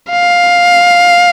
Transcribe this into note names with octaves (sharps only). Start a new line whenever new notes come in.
F5